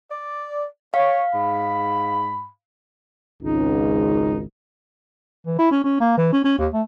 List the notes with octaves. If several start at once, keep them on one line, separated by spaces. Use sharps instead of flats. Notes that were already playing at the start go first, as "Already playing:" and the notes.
D5
C#5 F5
G#2 B5
G#1 C#2 D#4
E3
E4
C#4
C#4
A#3
E3
C#4
C#4
D#2
A3